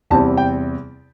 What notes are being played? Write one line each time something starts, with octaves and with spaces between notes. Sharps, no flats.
E2 C3 G3 C4 E4 A5
G5